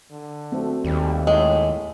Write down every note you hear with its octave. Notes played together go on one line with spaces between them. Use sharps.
D3
A3 C4 F#4
D#2 G3
A2 G#3